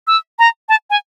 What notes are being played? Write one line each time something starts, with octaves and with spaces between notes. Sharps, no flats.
E6
A#5
A5
G#5